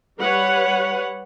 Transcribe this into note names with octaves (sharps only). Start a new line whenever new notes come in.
G3 B4 C#5 F#5